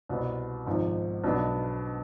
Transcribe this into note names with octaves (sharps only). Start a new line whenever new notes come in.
C2 B2 B3
G#1 G#2 F3
B1 B2 B3 D4